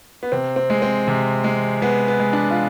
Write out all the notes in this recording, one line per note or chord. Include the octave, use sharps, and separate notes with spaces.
B3
C3 C4
C4
G#3
C4
C3
G#3
G#3 B3
B3
G#3
D4
F4